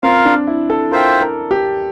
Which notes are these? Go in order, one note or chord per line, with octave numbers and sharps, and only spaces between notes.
C4 F4 A#4 F5
D4
E4
A4
F4 A#4 C5 E5 G5
A#4
G4